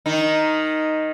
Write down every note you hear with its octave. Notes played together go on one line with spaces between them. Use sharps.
D#3 D#4